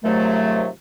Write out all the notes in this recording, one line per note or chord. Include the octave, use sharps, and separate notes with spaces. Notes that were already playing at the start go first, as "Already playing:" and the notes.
G#2 C3 D#3 F3 F#3 A3